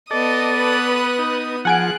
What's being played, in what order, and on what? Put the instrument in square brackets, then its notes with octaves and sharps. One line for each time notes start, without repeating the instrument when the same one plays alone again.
[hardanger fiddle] B3 D#6 [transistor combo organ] A4 D5 [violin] D#5
[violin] B4 F#6
[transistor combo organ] D#4
[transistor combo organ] F3 [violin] G#4 F#6 [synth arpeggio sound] F#5 G#5 D7